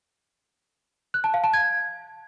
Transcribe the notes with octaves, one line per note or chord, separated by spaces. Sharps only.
F#6
A5
F5
A5
G#6